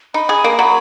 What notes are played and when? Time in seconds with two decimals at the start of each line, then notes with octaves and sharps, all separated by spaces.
0.14 D#4 B5
0.29 G#4
0.44 A#3
0.59 F#3